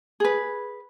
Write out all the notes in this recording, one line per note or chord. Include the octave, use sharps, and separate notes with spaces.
G#4 B4